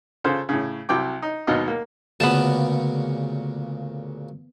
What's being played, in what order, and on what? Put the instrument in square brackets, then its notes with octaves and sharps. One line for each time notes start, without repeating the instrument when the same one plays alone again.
[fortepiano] C#3 F4 A4 C5
A2 C#3
C2 C3 F#3 G5 D6
D#4
G#1 D#2 B2 F#3 D#5 F5
A#3
[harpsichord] D2 A#2 C#3 [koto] B3 A5